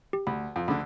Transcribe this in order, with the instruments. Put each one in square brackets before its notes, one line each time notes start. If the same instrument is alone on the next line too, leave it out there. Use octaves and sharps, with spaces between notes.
[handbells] G4
[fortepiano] D2 [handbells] B5
[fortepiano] F2
[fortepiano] D2 D3 [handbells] B5